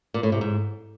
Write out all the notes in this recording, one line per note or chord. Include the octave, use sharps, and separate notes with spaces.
A#2
A2
C3
G#2